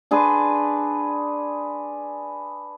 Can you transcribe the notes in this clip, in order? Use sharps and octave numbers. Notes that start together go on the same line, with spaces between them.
D4 G#4 B4 C6